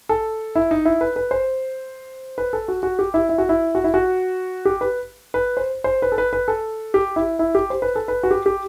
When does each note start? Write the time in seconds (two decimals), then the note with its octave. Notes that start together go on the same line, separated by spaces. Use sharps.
0.09 A4
0.56 E4
0.71 D#4
0.85 E4
1.01 B4
1.16 B4
1.31 C5
2.38 B4
2.53 A4
2.68 F#4
2.83 F#4
2.99 G4
3.14 E4
3.29 E4
3.38 F#4
3.49 E4
3.75 F#4
3.84 E4
3.94 F#4
4.65 G4
4.81 B4
5.34 B4
5.57 C5
5.84 C5
6.02 B4
6.12 A4
6.18 B4
6.33 B4
6.48 A4
6.94 G4
7.16 E4
7.39 E4
7.55 G4
7.70 C5
7.82 B4
7.96 A4
8.08 B4
8.23 F#4
8.31 G4
8.46 G4